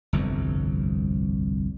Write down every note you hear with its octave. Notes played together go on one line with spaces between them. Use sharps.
G1 C2 F2